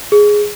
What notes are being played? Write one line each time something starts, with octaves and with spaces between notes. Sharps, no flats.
G#4